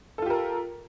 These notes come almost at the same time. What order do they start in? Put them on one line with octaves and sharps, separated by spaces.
A4 F4 G4 A#4